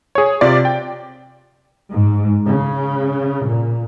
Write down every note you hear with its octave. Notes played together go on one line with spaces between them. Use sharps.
G#4 C#5
C3 F4 D5
G5
G#2
C#3
A#2